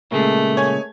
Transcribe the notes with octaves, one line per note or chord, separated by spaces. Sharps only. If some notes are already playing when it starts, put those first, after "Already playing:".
A#2 C#3 G#3 A3 G#4 A#4
C#5 G#5 G#6